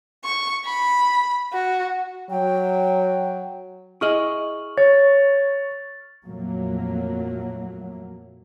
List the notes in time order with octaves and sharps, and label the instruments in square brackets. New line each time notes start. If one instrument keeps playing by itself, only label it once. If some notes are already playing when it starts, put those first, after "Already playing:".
[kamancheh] C#6
B5
F#4
[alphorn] F#3 [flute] G5
[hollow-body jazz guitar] E4 G#4 D#5 [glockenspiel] C#6 F6 F#7
[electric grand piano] C#5 [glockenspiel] A6
[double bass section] F2 A#2 F#3 A3 A#3